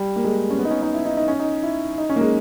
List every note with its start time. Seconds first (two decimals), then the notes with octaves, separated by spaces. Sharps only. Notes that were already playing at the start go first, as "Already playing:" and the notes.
Already playing: G3
0.16 A#3
0.24 G#3
0.50 C#4
0.59 B3
0.65 D#4
0.71 C#4
0.82 D#4
0.94 E4
1.05 D#4
1.17 D#4
1.28 C#4
1.39 D#4
1.63 E4
1.98 D#4
2.09 C#4
2.16 A#3
2.21 G#3